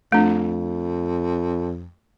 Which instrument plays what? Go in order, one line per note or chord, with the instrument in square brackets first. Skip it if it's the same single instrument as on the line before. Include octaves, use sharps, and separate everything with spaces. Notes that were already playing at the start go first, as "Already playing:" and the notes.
[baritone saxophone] F2 [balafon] A3 D4